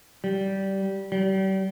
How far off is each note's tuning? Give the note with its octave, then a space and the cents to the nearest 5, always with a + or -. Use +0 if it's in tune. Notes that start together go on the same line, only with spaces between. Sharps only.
G3 -15
G3 -35